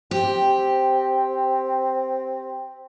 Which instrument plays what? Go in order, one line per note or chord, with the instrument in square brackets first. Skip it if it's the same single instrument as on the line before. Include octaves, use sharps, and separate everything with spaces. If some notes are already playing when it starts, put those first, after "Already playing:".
[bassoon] C4 [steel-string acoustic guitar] G4